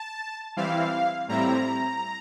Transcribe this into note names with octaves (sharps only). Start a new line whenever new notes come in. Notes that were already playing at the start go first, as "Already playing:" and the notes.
Already playing: A5
E3 G3 C4 E4 F5
A2 G3 C4 E4 A#5